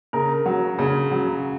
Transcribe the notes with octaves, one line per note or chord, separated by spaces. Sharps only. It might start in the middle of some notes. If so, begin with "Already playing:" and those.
C#3 A#4
F#3
C#3
F#3